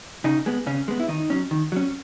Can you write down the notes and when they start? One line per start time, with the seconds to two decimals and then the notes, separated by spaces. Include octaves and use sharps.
0.24 C#3 D#4
0.46 G#3 B3
0.66 C#3 C#4
0.88 G#3 B3
1.00 E4
1.08 D#3 D#4
1.30 F#3 C#4
1.51 D#3
1.72 F#3 C#4